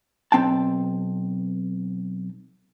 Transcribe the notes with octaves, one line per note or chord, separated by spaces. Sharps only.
B1 C4 G5 A5